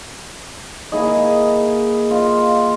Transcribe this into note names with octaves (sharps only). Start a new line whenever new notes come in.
A#3 E4 G#4 D#5
F4 D#5 F5